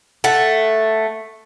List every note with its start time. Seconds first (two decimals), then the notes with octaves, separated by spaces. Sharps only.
0.24 A3 F#5